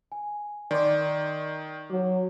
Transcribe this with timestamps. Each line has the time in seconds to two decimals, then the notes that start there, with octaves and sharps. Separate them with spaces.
0.12 G#5
0.71 D#3 D5 C6 D6
1.90 F#3 D6